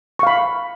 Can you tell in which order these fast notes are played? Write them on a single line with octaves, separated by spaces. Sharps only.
C#6 F5 B5